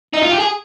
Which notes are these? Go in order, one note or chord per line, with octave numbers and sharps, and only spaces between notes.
D#4
F4
G4
G#4